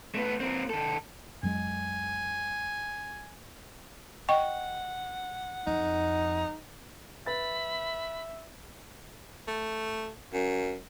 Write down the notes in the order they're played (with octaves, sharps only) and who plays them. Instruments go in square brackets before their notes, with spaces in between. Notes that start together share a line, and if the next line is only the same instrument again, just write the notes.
[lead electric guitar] A3 B3
A#3 C4
D#3 A4
[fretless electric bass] F#2 F#3 G#3 [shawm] G#5
[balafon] D#5 G5 C#6 [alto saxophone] F#5
[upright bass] F2 [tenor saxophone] D#4
[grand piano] B4 A6 [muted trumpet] E5 [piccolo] B5
[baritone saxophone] A3
F#2